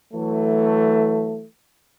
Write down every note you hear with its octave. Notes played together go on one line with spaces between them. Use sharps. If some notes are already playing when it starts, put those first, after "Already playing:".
E3 F#3 A3